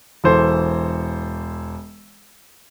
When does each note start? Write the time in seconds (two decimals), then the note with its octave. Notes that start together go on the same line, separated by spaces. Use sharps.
0.24 E1 E3 A4 C5 C6